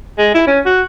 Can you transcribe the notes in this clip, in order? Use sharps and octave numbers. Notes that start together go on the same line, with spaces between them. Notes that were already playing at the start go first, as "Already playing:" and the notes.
G#3
E4
C#4
F#4